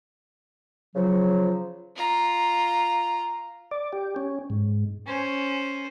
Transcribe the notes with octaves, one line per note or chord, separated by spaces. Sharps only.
C#3 F3 F#3
F4 A#5
D5
G4
C#4
G#2
C#4 C5